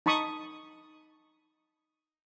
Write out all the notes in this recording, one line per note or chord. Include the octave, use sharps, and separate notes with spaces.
D#4 A5 B5 C#6 D#6